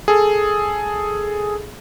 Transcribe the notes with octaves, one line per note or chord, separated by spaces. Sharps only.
G#4 A4